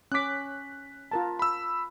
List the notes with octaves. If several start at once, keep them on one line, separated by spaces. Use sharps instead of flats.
C#4 D6 F#6 B6
F4 A#4 A5
B5 E6